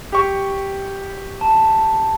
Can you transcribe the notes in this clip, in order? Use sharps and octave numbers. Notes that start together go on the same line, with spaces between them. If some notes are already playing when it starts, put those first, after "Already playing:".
G4 C#6
A5